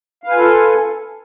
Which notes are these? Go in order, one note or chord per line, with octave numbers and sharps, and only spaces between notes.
F4 A4 B4 F5 G#5